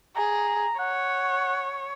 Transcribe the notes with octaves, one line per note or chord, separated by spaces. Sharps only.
G#4 A#5
C#5 F#5